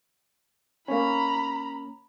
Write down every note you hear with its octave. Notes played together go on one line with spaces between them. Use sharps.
A#3 C#4 A#5 B5